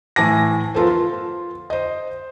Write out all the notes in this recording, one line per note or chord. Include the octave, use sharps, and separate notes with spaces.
A2 E3 G#5 A5 D6 A#6
F3 B3 F4 A4 A#4 C5
F4
C5 D#5